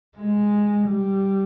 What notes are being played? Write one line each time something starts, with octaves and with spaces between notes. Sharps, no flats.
G#3
G3